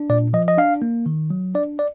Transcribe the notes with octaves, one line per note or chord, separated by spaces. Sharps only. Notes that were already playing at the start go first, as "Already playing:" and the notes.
Already playing: D4
A#2 D5
F3 D#5
D#5
D4 F5
A#3
D#3
F#3
D4 D5
D5